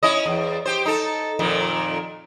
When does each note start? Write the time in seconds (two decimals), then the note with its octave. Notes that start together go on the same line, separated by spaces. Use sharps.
0.03 C#4 E4 D#5
0.26 E2
0.65 G4 C5
0.85 D#4 A4
1.39 F2 A#2 D#3